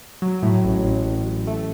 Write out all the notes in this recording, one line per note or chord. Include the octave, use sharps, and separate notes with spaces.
F#3
A2
A1
A1
A1
A1
A3